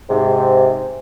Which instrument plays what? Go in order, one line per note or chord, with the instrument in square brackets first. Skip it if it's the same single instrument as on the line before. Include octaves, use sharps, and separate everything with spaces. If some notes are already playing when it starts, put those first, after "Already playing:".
[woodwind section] G#2 C3